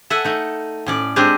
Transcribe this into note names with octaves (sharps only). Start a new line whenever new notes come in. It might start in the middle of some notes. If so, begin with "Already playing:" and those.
A4 E5 F#5 G#5
A3 D#4
A2 C#4 D5
G#3 C4 D4 G4 G#4